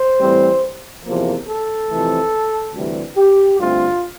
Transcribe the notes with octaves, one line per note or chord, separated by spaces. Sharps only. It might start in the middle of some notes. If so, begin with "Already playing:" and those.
Already playing: C5
A2 E3 G3 C4
E2 C3 F3 A#3
A4
F2 C3 E3 A3
D2 C3 E3 G3
G4
G2 D3 A3 C4 F4